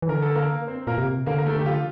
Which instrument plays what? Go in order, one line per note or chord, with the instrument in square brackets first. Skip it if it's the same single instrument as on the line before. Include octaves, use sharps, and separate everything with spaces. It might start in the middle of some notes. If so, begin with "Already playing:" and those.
[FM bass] E3
[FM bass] D3 [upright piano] A#4
[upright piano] A4
A#3 A#4
C4 C5
[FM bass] A#2 [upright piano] A#3 A#4
[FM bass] C3
[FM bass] D3 [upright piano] A#3 A#4
[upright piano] A#4
A3 A4
[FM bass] D3 [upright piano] G4
[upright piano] F3 F4